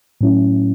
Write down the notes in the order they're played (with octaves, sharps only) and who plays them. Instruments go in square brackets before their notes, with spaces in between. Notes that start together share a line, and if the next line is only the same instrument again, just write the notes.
[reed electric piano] A2 F#3 C#4 E4